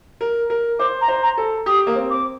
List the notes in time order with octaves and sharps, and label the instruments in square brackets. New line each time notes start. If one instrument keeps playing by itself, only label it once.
[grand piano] A#4
A#4
[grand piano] C5 [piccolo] D6
[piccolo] A#5
[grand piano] C5
[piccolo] A#5
[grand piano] A4
[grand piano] G4 [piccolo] D#6
[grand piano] A#3
C4
[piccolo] D6